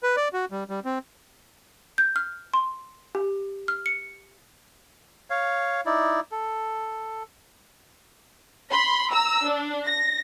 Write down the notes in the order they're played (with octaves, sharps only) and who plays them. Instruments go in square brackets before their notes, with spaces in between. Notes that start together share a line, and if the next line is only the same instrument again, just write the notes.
[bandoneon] B4
D5
F#4
G3
G3
C4
[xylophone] G6
F6
C6
G4
F6
C#7
[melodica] C#5 F5
D#4 E4 D5
A4
[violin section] B5 C6
A#5 E6
D4
A#6